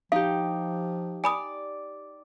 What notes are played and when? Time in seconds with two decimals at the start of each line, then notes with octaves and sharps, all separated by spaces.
0.12 F3 D#4 G4 F5
1.24 D5 G#5 B5 D#6